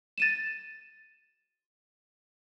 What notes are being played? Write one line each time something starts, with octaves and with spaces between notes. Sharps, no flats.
A6 D#7 E7